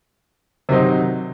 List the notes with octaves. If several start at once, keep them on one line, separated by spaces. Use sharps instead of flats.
C3 D#3 F#3 C4 D#4